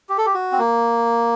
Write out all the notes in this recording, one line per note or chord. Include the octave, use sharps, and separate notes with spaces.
G4
A4
G4
F#4
C4
A#3